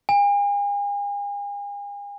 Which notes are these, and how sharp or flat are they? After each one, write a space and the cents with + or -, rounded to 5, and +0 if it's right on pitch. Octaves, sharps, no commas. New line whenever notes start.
G#5 -40